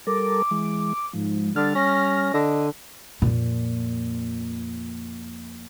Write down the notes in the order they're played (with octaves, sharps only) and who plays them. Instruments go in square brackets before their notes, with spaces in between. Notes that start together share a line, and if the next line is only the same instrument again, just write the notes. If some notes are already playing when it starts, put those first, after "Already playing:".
[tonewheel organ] G3 A4 A#4 [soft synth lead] D6
[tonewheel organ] E3 G#3
[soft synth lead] G#2 [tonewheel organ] F3
[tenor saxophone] D3 [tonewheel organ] G3 F6 [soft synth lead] A6
[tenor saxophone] C#4 [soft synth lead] A#6
[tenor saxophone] D3 [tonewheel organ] D#5
[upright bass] F2 A#2